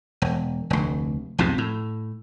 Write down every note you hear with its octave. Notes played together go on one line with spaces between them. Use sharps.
E1
F1 D2
B1 F2 G#2 B2
A2